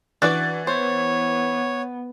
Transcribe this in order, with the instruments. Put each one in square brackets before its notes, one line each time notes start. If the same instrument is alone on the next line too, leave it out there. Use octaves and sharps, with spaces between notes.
[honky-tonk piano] E3 F#6 A6 [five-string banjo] D4 F#4 D5
[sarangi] B3 [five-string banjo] C5 [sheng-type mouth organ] C#5